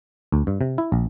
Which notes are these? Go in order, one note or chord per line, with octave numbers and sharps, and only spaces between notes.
D2
G2
C3
E4
A#1